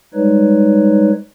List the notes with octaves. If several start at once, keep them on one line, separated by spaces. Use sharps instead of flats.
G3 G#3 D#4 B4 C#5